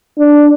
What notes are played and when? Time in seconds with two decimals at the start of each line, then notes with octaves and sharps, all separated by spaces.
0.19 D4